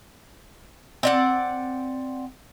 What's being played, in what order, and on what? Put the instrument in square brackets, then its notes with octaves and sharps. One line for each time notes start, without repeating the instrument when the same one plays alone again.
[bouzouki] C4 D5 F#5